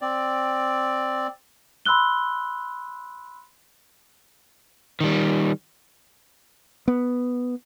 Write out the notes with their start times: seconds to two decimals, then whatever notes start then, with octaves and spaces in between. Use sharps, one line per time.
0.02 C4 D5
1.85 B5 C6 E6 F#6 G7
5.01 D#3 G3
6.88 B3